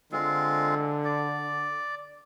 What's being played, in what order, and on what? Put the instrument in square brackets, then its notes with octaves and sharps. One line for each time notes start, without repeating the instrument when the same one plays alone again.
[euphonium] D3 [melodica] G#3 C4 F4
[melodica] D5